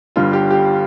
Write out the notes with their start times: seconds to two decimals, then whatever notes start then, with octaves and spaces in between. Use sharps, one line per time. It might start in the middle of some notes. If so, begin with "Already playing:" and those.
0.16 G1 G2 D3 G3 F4
0.33 G4
0.51 G4